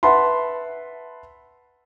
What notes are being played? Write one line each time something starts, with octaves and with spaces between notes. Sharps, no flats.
B4 E5 F#5 A5 B5 C6